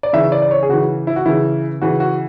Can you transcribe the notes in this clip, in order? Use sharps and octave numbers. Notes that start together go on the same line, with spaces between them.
D5
C#3 E3 E5
D5
D5
C#5
G#4
C#3 E3 F#4
E4
F#4
C#3 E3 E4
C#3 E3 F#4
F#4